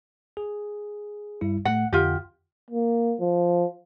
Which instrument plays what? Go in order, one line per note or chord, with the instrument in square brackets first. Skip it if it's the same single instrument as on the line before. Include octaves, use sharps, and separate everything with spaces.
[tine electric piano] G#4
G2 G3 E4
[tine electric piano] A2 A3 [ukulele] F#5
[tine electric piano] F2 D3 F#5 [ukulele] F4 G4
[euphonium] A#3
F3